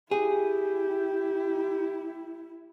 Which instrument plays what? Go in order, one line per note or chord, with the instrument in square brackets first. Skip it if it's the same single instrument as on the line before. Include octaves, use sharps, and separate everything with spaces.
[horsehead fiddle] E4 [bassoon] G4 [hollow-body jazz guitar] G#4